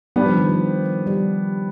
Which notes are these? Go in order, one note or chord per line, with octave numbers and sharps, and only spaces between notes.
G3 B3 D4 G4
F3
D#3
F3
G3